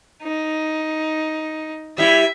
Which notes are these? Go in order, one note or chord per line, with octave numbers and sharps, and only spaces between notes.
D#4
G3 E4 E5